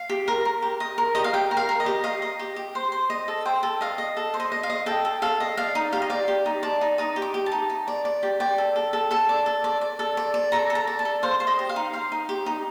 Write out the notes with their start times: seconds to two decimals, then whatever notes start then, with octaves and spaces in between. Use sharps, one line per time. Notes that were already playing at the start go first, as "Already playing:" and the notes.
Already playing: F5
0.09 G4
0.28 A#4
0.45 A#4
0.62 G4
0.80 D#5
0.98 A#4
1.15 G4 D#5
1.24 F5
1.33 G4 G5
1.51 A#4
1.57 F5
1.69 A#4
1.80 D#5
1.86 G4
2.04 D#5 F5
2.22 D#5
2.39 G4
2.56 G4
2.75 C5
2.92 C5
3.10 D#5
3.28 A4
3.45 C5 G5
3.63 A4
3.81 D#5 F5
3.98 D#5
4.17 A4
4.34 C5
4.40 D#5
4.52 D#5
4.63 F5
4.70 D#5
4.86 A4 G5
5.05 A4
5.22 A4 F5
5.40 D#5
5.57 D5 F5
5.75 D#4
5.93 G4 F5
6.02 D#5
6.10 D5 F5
6.28 G4
6.46 D#4
6.63 D5 A5
6.81 D#4
6.98 D#4 D#6
7.16 G4
7.22 D6
7.34 G4
7.46 A5
7.52 D#4
7.70 D#4
7.88 D5
8.05 D5
8.23 G4
8.40 D5 G5
8.58 A4
8.76 A4
8.93 A4
9.11 A4 A5
9.29 D5
9.46 A4
9.64 D5
9.81 D5
9.99 A4
10.17 D5
10.34 D5
10.52 A4 A#5
10.70 A4
10.75 A#5
10.87 D5
10.99 A5
11.05 A4
11.23 C5 F5
11.40 C5
11.47 D#5
11.59 G4
11.69 F5
11.76 D#4
11.93 C5 F5
12.12 D#4
12.29 G4
12.46 D#4